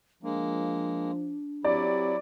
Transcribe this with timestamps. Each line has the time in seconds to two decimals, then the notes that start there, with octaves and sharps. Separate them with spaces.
0.23 F3 G#3 A#3 D4
1.64 F#3 C4 E4 G4 D5